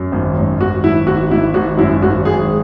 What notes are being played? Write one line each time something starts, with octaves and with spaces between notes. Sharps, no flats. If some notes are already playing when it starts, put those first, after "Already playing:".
Already playing: F#2
G#1
F#2
G#1 F#4
G#1 E4
G#1 F#4
G#1 E4
G#1 F#4
F#2 E4
G#1 F#4
G#1 G#4